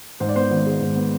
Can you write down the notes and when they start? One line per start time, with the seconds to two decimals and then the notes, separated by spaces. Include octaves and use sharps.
0.20 G#2 C5
0.29 D5
0.35 B3 C5
0.50 G#1
0.66 G#3
0.81 G#2
0.96 B3